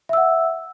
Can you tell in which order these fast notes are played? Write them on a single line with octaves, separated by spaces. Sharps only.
E5 E6 F#5